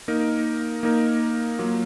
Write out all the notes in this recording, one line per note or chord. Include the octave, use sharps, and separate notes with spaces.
A#3 D#4 A#4
A#3 D#4 A#4
F#3 A#3 F4